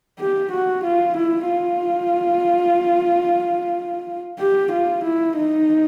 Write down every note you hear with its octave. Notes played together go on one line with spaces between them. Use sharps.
G4
F#4
F4
E4
F4
G4
F4
E4
D#4